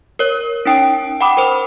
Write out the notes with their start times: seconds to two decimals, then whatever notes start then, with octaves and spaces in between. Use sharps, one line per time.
0.19 A#4 C#5
0.65 C#4 D#4 G5 D#6 D7
1.21 F#5 G5 B5 D6 D#6
1.37 A#4 C5